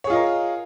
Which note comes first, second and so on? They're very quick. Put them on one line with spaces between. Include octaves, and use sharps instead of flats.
C#5 G#4 F4 D#5 A#4